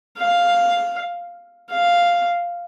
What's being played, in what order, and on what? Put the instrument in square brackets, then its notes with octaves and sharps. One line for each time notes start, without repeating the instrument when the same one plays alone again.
[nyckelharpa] F5
F5